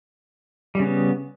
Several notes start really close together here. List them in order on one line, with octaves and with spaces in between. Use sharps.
G3 C#3 B3